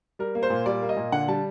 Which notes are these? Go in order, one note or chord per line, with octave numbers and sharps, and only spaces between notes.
G3 A#4
A#3
C5
A#2
G3 D5
A#3
D#5
A#2
D3 F#5
G3 A5